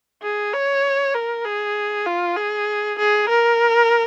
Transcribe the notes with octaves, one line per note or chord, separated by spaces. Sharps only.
G#4
C#5
A#4
G#4
F4
G#4
G#4
A#4